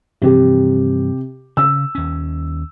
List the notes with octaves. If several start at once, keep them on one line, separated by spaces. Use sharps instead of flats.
G2 C3 E3 F3 G4
C#3 C#4 E6
D#2 C#4